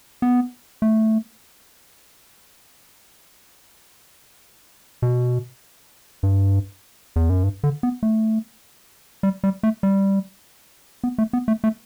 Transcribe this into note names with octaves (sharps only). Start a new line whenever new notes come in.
B3
A3
B2
G2
E2
F#2
G2
D3
B3
A3
G3
G3
A3
G3
B3
A3
B3
A3
A3